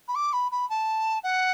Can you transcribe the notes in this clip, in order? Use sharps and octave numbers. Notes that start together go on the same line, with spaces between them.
B5
D6
B5
B5
A5
F#5